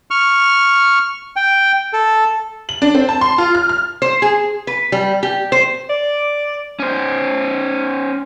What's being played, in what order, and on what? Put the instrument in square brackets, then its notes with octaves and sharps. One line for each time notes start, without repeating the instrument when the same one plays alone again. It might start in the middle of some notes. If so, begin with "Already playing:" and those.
[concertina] C#6 F6
G5
A4
[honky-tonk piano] F#7
D4
C4
A5
C6
F4
F6
F6
[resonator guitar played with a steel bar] C5
G#4
B4
G3
G4
C5
[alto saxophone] D5
[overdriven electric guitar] C#4 C5